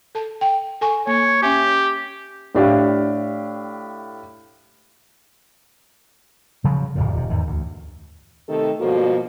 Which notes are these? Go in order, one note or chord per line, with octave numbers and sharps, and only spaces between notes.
A4 A5
G5
A4 G#5 C#6
A#3 C#5
C#4 G4 E5 G#5
A2 D4 G4 F5
C#3 F3 F#3
D1 F2 A2
D#1 C3
E2 G#2 D#3
D2
C3 D#3 A3 G4 A4
G2 B2 F3 G#3 A#3 F#4